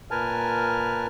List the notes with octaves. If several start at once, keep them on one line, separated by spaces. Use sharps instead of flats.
A#2 A#4 B4 G#5 A5 F6